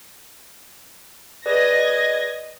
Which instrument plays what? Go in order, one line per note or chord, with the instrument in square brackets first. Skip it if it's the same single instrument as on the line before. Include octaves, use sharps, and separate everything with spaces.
[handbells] G#4 B4 D5 [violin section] D#5 G#6 A#6